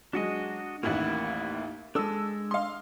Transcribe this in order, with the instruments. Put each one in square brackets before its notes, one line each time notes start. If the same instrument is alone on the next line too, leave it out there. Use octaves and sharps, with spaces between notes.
[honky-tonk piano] F#3 G#3 [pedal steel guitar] D4 F#4 D#5
[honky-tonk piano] A1 D#2 A2 [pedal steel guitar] A#3 E4 F#5
[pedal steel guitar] G#3 D4 [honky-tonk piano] A4 E6
[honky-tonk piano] F5 C6